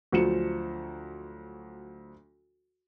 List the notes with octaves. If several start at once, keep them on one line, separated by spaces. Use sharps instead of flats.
D2 F3 F#3 C#7 E7